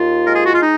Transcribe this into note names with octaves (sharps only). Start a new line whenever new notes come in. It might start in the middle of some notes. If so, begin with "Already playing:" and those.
Already playing: D#2 F4
G#3 A#4
G#4
F#4
F4
D#4